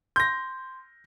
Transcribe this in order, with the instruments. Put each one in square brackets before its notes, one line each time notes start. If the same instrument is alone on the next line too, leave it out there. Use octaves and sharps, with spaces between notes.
[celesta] C6 [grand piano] G6 A#6